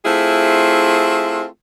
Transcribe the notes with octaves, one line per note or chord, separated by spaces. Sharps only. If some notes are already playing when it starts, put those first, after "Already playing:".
A3 C4 E4 F4 G#4